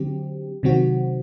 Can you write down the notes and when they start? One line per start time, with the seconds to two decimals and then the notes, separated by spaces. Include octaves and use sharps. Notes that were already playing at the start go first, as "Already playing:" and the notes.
Already playing: D3 F#3 C4 G4
0.63 C3 D#3 F#3 C4 F#4